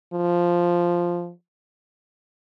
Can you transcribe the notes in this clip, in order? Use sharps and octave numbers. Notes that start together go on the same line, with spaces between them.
F3